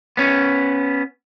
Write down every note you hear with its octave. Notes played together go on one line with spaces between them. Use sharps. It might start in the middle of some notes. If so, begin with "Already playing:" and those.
B3 C#4